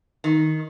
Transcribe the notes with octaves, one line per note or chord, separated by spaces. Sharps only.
D#3